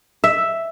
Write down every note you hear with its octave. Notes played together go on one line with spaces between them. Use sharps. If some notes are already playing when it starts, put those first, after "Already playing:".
E5